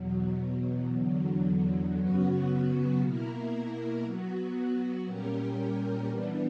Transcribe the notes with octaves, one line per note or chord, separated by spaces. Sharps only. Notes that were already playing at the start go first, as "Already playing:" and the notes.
Already playing: E2 B2 F#3
E2 D3 F#3
F#2 C#3 F#3 B3 F#4
B2 A#3 E4 A#4
F#3 B3 F#4
A#2 G3 C#4 G4 A#4
E3 G3 B3 D4